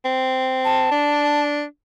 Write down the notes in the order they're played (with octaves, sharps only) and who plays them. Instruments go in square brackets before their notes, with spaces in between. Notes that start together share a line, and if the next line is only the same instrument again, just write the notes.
[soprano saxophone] C4
[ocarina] A5
[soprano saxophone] D4